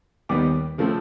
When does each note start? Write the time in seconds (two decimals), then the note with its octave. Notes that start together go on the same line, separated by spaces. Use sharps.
0.29 D#2 D#3 G3 B3 D6
0.78 C#3 F3 A3 C4